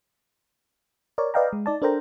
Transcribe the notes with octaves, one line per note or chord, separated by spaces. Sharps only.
A#4 C#5 D5
B4 D5 D#5 F5 G5 A#5
G#3
D#4 D5 A5
D4 A4 A#4 C5 G5 A#5